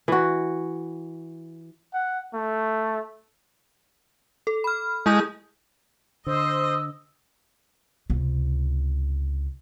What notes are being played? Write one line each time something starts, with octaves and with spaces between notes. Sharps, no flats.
E3 F#4
F#5
A3
A4
B5 F6
G#3 E4 G#4 G6
D3 C5 D#5 E6
C#2 C3